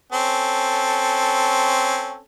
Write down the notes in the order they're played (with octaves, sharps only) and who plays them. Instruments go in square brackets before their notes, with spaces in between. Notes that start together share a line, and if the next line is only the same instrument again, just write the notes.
[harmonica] C4 C#4 A4